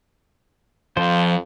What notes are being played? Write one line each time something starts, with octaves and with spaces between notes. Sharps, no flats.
F2 F3 F4 C5